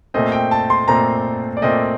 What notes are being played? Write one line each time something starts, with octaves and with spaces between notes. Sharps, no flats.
A#2 A3 C4 D#5
G5
A5
C6
A#2 A3 C4 A#5
D5
A#2 A3 C4 D#5